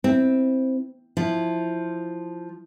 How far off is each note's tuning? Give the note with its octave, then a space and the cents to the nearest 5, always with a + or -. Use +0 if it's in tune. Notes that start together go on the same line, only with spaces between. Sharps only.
C4 +0 E4 -15
F3 +0 E4 +0